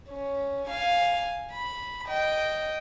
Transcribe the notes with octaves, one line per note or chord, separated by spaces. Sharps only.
C#4
F5 G#5
B5
D#5 G5